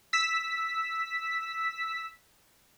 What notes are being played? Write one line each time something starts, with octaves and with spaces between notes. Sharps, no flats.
E6 B6